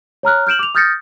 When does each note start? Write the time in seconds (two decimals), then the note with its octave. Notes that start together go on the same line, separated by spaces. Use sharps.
0.23 C#5 A#5 F6 F#6
0.47 F6 G6 D7 E7 F#7
0.59 D6 F7
0.75 D#6 F6 G6 A6 A#6 C#7